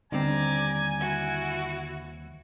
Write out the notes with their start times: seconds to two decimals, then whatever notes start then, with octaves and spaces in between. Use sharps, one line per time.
0.12 D#2 D3 G3 C4 D5 G#5 A#5
0.99 E4 F#4